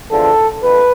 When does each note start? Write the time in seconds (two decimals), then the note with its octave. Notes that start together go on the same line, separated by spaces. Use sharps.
0.11 E2 D3 F3 A4
0.63 F2 B4